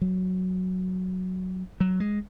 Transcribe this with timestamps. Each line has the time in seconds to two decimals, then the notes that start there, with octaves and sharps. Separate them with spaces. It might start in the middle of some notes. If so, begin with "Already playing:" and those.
0.01 F#3
1.80 F#3
2.00 G#3